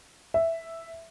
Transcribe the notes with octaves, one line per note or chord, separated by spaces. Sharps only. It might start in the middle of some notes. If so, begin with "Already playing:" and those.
E5